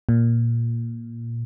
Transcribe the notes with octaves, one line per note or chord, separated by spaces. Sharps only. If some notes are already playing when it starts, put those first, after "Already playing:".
A#2